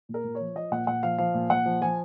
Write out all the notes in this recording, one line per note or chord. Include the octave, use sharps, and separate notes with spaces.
A#2
A#4
A#2
C#5
F3
F3 D#5
A#2 F#5
A#2 F#5
F3 F5
F3 F5
A#2
A#2 F#5
F3
F3 G#5